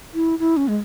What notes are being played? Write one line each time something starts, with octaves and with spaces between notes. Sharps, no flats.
E4
E4
C#4
G#3